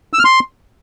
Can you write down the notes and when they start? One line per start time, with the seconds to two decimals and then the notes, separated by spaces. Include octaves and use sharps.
0.13 E6
0.19 F6
0.25 C6